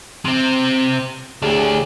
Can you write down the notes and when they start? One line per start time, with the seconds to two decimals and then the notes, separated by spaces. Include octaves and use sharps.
0.25 C3 C4
1.42 D2 A2 D4 G4 G#4